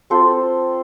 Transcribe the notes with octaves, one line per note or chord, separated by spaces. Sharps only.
C4 F4 A4 C5